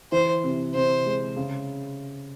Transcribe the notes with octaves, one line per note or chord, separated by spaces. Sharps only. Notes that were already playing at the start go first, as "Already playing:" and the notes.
E3 C5
C3
C3 C5
G#3
C#3